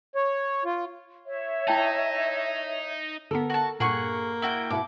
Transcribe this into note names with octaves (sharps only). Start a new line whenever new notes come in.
C#5
F4
C#5 E5
D#4 E4 G5 A5
D3 B3 A4 A#4
F#4 A5
G2 A#2 A#3 G#4 F#5 C#6
E4 F#4 G5
B2 E4 F#5 D6